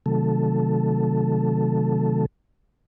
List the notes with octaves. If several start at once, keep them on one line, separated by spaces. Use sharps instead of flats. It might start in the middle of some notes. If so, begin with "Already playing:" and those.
C3 D#3 F#3 A3 A4